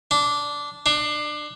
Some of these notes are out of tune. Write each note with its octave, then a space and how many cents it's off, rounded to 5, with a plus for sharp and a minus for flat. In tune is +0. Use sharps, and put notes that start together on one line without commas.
D4 -10
D4 +25